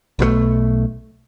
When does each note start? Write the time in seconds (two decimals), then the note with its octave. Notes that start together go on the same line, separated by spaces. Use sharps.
0.19 B1 B2 E3 A3